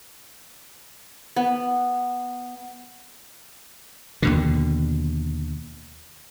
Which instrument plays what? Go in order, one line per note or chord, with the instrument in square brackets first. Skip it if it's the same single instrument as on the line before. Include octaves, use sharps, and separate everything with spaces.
[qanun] B3
[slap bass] D#2 B2 D3